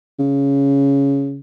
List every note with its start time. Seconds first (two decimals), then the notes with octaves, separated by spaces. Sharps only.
0.19 C#3